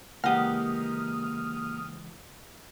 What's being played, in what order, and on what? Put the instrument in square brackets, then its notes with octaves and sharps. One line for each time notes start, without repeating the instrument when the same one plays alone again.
[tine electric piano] C#3 E3 G#3 [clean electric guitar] A#3 G4 [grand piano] F#5 [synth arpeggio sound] D#6 F6